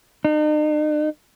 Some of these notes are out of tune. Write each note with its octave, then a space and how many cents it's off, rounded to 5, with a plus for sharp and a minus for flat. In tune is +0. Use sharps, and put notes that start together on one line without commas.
D#4 -45